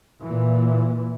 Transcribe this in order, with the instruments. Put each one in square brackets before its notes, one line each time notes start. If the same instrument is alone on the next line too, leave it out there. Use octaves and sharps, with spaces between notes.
[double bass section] A#2 E3